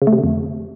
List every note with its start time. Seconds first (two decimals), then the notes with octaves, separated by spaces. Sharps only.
0.02 C#3
0.07 A3
0.13 C3
0.18 D3
0.24 F2